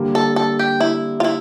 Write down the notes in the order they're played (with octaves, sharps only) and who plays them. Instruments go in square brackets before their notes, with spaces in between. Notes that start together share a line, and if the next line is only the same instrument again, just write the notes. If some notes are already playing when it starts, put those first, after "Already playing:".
Already playing: [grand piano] D3 G3 A#3
[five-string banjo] A4
A4
G4
E4
F4
E4